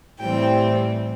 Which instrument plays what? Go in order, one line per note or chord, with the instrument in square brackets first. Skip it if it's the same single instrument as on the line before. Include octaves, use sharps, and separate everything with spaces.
[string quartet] A2 E3 G3 C4 G5